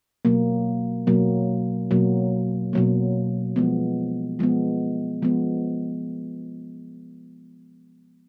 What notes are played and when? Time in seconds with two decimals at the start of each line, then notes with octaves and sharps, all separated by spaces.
0.25 B2 F#3 A#3
1.07 B2 F#3 A#3
1.91 B2 F#3 A#3
2.73 B2 F#3 A#3
3.56 F3 G#3 B3
4.39 F3 G#3 B3
5.22 F3 G#3 B3